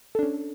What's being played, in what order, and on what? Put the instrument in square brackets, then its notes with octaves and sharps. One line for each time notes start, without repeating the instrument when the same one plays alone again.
[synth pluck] A4
D4
C#4